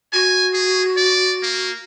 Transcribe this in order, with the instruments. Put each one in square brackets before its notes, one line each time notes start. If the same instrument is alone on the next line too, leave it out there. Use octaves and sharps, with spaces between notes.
[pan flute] F#4 [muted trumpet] G#5
[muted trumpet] G#4
D5
A#3